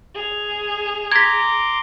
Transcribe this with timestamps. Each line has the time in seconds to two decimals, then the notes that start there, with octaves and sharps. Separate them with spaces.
0.15 G#4 F7
1.12 A#5 C6 D6 G#6 B6